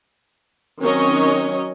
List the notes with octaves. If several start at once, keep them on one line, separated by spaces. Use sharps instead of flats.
D#3 F#3 C4 C#4 C#5 D#5